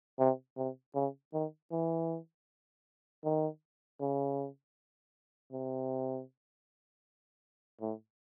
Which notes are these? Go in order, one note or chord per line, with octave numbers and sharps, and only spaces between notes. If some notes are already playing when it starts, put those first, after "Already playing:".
C3
C3
C#3
D#3
E3
D#3
C#3
C3
A2